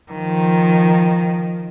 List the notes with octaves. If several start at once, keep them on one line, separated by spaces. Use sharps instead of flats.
D#3 F3